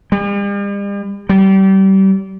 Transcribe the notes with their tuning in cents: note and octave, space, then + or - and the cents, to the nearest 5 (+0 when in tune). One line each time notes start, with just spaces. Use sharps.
G3 +45
G3 -30